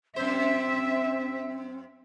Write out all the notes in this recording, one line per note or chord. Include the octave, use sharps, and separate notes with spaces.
F#2 C4 C5 E5